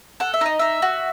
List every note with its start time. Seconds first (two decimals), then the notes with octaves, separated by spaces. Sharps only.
0.20 A4 F#5
0.34 E5
0.41 D#4 D#5
0.59 D#4 E5
0.82 F#4